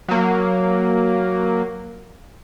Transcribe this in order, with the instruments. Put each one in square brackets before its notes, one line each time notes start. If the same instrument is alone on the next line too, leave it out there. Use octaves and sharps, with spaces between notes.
[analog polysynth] F#3 A#3